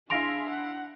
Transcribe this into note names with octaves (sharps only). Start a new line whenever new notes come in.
D4 E4 G#4 F5 C6 A#6 D7 F7
F#5